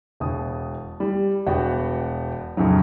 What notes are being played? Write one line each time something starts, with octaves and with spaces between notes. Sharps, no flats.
E1 B2 D#6
G3
E1 B3 F#4 D5 G5
A#1 F2 C#3 F#3